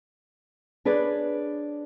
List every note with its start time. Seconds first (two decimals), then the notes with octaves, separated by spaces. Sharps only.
0.85 D4 G#4 B4 C#5 D5